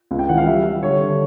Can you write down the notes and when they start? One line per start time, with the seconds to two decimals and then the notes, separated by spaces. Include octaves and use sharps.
0.11 C#2
0.19 G5
0.29 E3 F#5
0.37 F5
0.46 G3 E5
0.65 G3
0.82 D3 C#5
1.01 D3